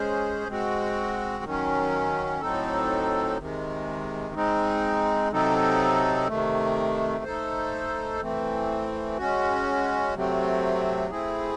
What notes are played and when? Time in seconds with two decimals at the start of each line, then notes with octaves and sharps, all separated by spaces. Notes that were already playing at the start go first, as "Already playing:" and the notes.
Already playing: G#3 C#4 G#4 C5
0.48 G#3 C4 F#4
1.44 D#3 F#3 C#4
2.41 A2 F#3 C4 D#4 A4
3.37 C3 D#3 G#3
4.35 G#3 C4 D#4
5.31 C3 F#3 C4 D#4 A4
6.28 C3 D#3 A3
7.24 A3 D#4 A4 C5
8.21 E3 A3 C4
9.18 G#3 C#4 F#4
10.14 C3 F#3 A3 C4
11.11 A3 C4 E4 G#4